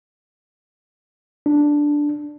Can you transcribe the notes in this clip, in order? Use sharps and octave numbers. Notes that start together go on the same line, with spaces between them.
D4